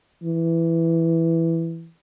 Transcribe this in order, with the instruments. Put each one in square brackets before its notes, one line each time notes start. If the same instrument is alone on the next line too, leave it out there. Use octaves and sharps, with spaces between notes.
[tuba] E3